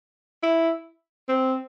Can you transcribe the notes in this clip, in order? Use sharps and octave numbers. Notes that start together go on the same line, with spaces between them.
E4
C4